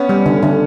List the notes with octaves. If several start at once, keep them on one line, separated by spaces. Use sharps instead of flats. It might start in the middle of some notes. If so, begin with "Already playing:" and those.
Already playing: B3 C#4
G3
D3
D3